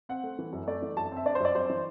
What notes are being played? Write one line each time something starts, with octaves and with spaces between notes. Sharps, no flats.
C4 F#5
A3
E3
F#2
A3 D5
E3
F#2 A5
C4 E5
D4 D5
C5
F#2 D5
F#2 C5
E3